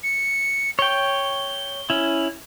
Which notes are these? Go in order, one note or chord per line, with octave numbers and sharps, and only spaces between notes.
C#7
C#5 G5 G7
C#4 E4